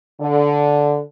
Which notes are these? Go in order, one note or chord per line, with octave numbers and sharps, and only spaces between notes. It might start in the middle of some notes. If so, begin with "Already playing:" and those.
D3